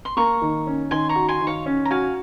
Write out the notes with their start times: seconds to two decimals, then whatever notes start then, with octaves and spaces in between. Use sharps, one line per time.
0.05 C6
0.17 A#3 A#5 C#6
0.42 D#3
0.67 C#4
0.91 D#3 G#5 C6
1.09 A#5 C#6
1.16 F#4
1.28 G#5 C6
1.41 D#3
1.47 C#5 F5
1.66 C#4
1.85 A#5
1.91 F#4 F5 G#5